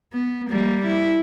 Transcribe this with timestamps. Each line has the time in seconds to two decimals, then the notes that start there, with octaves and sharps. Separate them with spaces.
0.13 B3
0.50 G3 A#3
0.86 E4